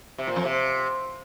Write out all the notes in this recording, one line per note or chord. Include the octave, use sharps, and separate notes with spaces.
C3
A#2
F2
C3